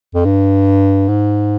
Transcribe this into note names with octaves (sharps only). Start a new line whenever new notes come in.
F2
G2
G#2